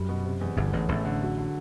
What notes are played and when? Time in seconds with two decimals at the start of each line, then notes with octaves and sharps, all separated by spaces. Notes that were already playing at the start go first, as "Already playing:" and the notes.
Already playing: F#2 G3
0.09 B2
0.25 C3
0.41 E2
0.57 G1 G2 D3
0.73 A1 E2 A2
0.89 A1 A2 A3
1.05 D3
1.22 F#3
1.38 D3